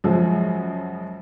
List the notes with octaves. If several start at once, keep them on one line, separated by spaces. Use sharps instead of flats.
F#2 C#3 F3 F#3 G#3